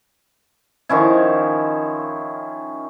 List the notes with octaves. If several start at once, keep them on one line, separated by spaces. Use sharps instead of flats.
D#3 F3 C#4 E4